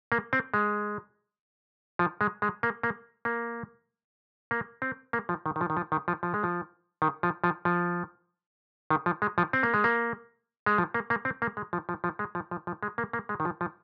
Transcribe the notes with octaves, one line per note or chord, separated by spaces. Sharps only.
A#3
C4
G#3
F3
G#3
G#3
A#3
A#3
A#3
A#3
C4
A#3
F3
D#3
D#3
F3
D#3
F3
D#3
F3
F3
G#3
F3
D#3
F3
F3
F3
D#3
F3
G#3
F3
C4
A#3
G#3
A#3
G#3
F3
A#3
A#3
C4
A#3
G#3
F3
F3
F3
G#3
F3
F3
F3
G#3
A#3
A#3
G#3
D#3
F3
F3